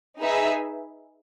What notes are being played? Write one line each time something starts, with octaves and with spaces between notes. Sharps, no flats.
D#4 G#4 B4 E5